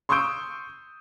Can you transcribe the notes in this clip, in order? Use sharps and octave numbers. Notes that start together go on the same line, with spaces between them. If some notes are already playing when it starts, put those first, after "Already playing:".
C6 C#6 D#6 E6 G6 D7